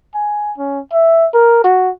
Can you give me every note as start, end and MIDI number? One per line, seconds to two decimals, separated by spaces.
0.14 0.52 80
0.58 0.79 61
0.93 1.27 76
1.34 1.60 70
1.64 1.90 66